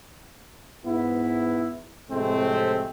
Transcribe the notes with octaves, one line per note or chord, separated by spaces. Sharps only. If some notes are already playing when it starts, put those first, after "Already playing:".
G#2 B3 E4
A2 C3 F3 G#3 A3 C4